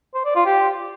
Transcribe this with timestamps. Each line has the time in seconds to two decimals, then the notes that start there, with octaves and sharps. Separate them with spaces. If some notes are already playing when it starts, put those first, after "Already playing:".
0.15 C5
0.25 D5
0.36 F4
0.46 G4